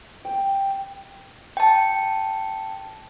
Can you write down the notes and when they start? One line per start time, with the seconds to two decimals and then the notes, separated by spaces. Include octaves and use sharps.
0.25 G5
1.57 G5 A5